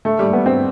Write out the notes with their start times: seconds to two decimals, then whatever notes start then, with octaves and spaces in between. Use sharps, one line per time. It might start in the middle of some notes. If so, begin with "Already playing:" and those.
0.05 A3
0.19 G3
0.33 B3
0.46 C4